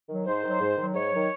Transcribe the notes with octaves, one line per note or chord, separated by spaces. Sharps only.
D#3 F#3
G#2 C5
D#3 F#3
G#2
D#3 F#3
G#2 C#5
D#3 F#3